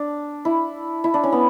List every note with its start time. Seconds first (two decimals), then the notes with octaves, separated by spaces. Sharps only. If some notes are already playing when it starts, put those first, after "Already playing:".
Already playing: D4
0.45 E4
1.04 E4
1.14 D4
1.24 C#4
1.32 B3